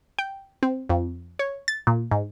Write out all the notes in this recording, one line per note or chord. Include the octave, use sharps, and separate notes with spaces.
G5
C4
F2
C#5
A6
A#2
G#2